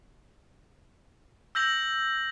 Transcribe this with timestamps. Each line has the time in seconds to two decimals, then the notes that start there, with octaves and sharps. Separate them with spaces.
1.55 E6 G6 A#6 F#7